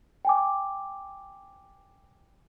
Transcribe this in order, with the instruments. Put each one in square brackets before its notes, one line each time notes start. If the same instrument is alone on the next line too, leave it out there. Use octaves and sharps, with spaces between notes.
[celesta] G5 G#5 D6